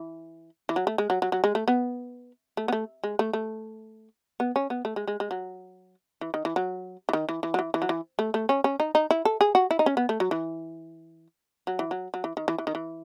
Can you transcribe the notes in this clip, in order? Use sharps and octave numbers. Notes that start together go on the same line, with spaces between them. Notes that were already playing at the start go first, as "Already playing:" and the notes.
Already playing: E3
E3
F#3
A3
G#3
F#3
F#3
F#3
G#3
A3
B3
A3
B3
A3
G#3
A3
A3
B3
C#4
B3
A3
G#3
G#3
G#3
F#3
E3
D#3
E3
F#3
E3
D#3
E3
E3
F#3
E3
E3
F#3
E3
A3
A3
C#4
C#4
D#4
D#4
E4
A4
G#4
F#4
E4
D#4
C#4
B3
A3
F#3
E3
F#3
E3
F#3
F#3
E3
D#3
E3
E3
D#3
E3